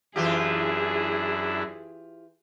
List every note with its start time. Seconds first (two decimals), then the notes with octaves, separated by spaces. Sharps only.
0.16 F#2 E3 D4 E4 F4 G4 G#4